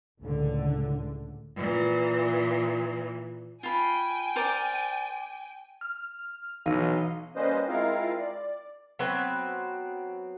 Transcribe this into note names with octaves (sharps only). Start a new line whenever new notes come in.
C#2 A2 D3
A#2 E3
F4 G5 G#5 B5
A#4 C5 D5
F6
B1 E3 D#4 F5
G3 A#3 C#4 B4 C5 D#5
G#3 C4 E4 F4 A#4 F5
D5
F#3 B3 C4 B4